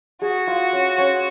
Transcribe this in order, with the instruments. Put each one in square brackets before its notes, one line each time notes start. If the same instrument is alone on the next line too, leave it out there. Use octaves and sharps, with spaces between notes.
[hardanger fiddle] F#4 [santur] G#4
[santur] F4
C#4
C#4